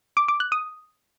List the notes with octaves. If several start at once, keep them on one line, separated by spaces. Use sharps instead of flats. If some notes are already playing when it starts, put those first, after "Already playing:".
D6
D6
F#6
D#6